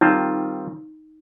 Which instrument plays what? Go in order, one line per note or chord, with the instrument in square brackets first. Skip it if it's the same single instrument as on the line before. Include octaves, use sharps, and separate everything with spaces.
[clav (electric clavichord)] D#3 G3 C4 F4 C5 [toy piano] D#4